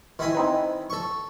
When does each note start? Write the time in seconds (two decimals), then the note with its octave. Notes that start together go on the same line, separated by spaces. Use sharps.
0.19 D#3 E4 G#5
0.35 C4 D#4 B4
0.90 A4 C#6